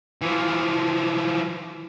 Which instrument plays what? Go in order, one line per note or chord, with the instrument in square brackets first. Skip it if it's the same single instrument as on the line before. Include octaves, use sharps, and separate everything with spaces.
[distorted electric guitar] E3 F3